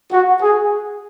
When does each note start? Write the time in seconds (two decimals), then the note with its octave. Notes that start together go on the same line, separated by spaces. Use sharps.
0.12 F#4
0.42 G#4